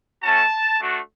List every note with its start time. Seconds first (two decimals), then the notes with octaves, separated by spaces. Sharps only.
0.23 A3 C#4 F#4 A5
0.80 A3 D4 F#4